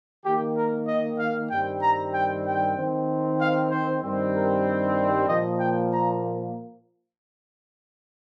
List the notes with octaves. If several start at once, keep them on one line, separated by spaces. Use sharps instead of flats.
D#3 A#3 G4
A#4
D#5
F5
G2 D#3 G3 C4 G5
A#5
G5
G5
D#3 C4
F5
C5
G2 D#3 G3 C4
A#4
A#2 F3 A#3 D#5
G5
A#5